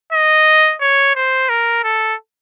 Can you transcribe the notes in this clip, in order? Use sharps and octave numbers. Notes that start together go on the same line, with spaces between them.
D#5
C#5
C5
A#4
A4